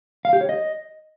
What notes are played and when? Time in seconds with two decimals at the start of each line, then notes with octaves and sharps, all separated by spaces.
0.25 F5
0.33 G4
0.41 C#5
0.49 D#5